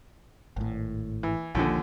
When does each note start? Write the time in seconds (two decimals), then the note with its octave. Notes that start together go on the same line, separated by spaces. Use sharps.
0.57 G#1 A2
1.23 E3
1.55 A#1 D#2 A#2 D3 F3